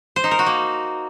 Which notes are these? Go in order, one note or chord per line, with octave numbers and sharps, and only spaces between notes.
C5
D#4
A#4
F#4
A#3